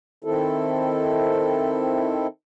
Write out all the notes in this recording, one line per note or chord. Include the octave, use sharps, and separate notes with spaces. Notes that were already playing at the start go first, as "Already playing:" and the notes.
D#3 C4 E4 A4